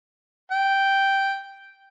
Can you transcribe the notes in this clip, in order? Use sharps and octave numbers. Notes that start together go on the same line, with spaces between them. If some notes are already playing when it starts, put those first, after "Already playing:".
G5